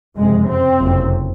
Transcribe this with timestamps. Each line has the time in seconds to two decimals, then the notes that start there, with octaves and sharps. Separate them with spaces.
0.16 F#1 F2 C3 G#3
0.49 C4
0.80 F#1 F2 C3